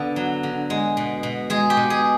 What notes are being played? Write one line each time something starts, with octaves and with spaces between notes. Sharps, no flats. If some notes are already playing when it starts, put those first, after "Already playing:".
Already playing: D3 B3 A4
F#3
D3
G#3
B2
B2
G#3 G#4
G4
B2
G#4